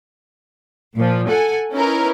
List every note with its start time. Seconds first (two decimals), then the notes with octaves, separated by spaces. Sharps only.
0.96 A#2 F3
1.28 A4 F#5 G#5
1.72 C#4 D#4 E4 A#4 B4